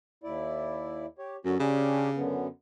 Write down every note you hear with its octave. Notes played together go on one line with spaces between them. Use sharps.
D#2 E4 D5
G4 C#5
F#2 D3 C#4 F#4
C#3 C#4 D4 G4
F#2 D3 B3